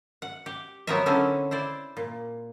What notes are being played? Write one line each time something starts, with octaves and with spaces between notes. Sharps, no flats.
F#5
G4
F#3 B3 C4 A#4 C#5 E5
D3 C4 C#4 E4 A4
E4 C5 D5
A#2